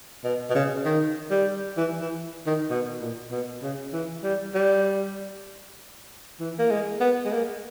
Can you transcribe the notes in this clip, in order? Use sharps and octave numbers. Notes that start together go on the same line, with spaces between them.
B2
B2
C#3
D#3
G3
E3
E3
D#3
B2
A#2
B2
C#3
E3
G3
G3
E3
A#3
G#3
B3
G#3
A#3